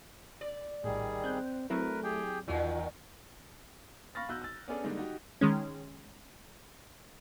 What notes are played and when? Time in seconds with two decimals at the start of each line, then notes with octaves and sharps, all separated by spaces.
0.41 D5
0.84 A#1 A2 D#3 G3 G#4
1.24 C4 F#6 G6
1.70 F#3 A3 C4 E4 A#4 B4
2.04 G4 G#4 G5
2.48 E2 A#2 D#3 E3 F#3 F4
4.15 F5 B5 C#6 F6 A6 A#6
4.29 B1 F#4 E6 F#6 G6
4.42 E6 A6
4.68 B3 C#4 D4 G#4 A4 D5
4.84 D3 D#3 G3 G#3 A#3 D#4
4.97 D#4 F#4 G4
5.41 D#3 G#3 C#4